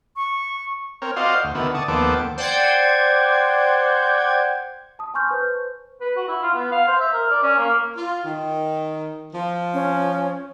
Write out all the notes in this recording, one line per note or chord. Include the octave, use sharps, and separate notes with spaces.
C#6
C4 A#4 C#5
F4 F#4 C5 D5 D#5 F5
D2
D3 D#3 B3 E4 F#4
D5 A5 C#6 D#6
D#2 F3 B3 A4 D6
C5 D5 F#5 G5 G6 G#6
A5 D#6
G#5 A5 C6 C#6 F6 G6
B4 C5
B4
F#4
E4
F4
B3
F5
C5
E5
A#4
D5
C#4
A#3
F4
D#3
F3
C#4